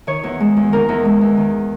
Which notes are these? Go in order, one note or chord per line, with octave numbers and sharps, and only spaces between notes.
D#3 C#5
E2
G#3
E2
D#3 A#4
E2
G#3
E2
D#3